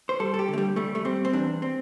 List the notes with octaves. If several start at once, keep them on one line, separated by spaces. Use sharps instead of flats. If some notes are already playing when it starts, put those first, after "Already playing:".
C5
G3 A4
A4
G4
D3
A3
G3
G3 A3
A3
G3 C4
C4
E2 D4
C4